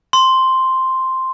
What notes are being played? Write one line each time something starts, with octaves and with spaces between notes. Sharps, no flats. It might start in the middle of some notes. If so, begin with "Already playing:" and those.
C6